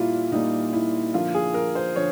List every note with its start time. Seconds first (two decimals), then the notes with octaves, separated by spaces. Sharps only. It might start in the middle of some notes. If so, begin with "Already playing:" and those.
Already playing: A#2 G3 A#3 E4 F4
0.31 A#2 G3 A#3 D#4
0.73 E4
1.14 D3 F3 A#3 F4
1.34 G#4
1.54 A#4
1.75 C5
1.96 D3 F3 C#5